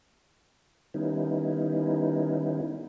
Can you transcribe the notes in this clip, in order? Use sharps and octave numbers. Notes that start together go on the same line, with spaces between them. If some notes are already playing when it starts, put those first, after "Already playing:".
D#3 G3 B3 C#4 D#4 E4